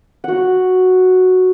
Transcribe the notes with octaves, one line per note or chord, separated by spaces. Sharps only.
F#4 F#5